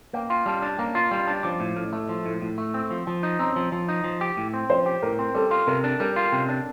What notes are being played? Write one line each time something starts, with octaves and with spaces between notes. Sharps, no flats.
A#3 G5
F4
G3 A5
D4
A#3 A#5
F4
G3 C6
D4
F3 D6
A2
A2 F6
A3
F3
A2
A2
A3
C4
F3
F3
D#4
C4 A#5
F3
F3
D#4
F3
G4
A2
C4
F3 C5
G4
A2 A#4
C4
G3 A4
F4
C3 A#4
D4
G3 A#4
F4
C3 G5
D4